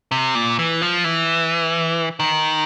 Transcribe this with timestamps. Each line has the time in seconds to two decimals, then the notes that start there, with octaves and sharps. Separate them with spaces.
0.11 C3
0.35 A#2
0.59 E3
0.82 F3
1.04 E3
2.20 D#3